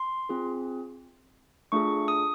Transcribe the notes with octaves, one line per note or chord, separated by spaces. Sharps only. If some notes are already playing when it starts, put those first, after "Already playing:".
Already playing: C6
C4 F4 G#4
A3 D4 F4 G#4 C#6
D#6